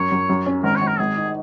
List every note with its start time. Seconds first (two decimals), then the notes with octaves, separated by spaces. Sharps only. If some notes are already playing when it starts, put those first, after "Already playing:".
Already playing: F#2 C#5
0.12 F#2
0.29 F#2
0.46 C#4
0.63 G#1 A#4
0.76 C#5
0.81 G#1
0.87 A#4
0.98 G#1 G#4
1.17 D#4